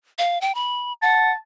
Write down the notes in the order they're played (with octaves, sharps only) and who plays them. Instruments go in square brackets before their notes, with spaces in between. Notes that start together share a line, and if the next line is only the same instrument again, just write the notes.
[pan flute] F5
G5
B5
[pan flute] F#5 [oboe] A5